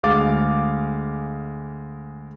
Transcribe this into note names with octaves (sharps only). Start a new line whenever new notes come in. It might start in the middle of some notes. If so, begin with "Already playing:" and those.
D2 G#3 F5 D6 A6